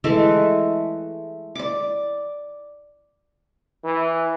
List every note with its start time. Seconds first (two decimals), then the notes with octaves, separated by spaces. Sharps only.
0.04 E3 G#3 A3 A4
1.55 D5 D6
3.84 E3